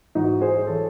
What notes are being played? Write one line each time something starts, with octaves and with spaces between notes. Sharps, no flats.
G#2 E3 D#4 F#4
G#4 C5
E3 A4 C#5